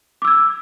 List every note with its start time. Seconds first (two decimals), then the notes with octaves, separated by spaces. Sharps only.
0.22 D6
0.25 E6
0.28 G#6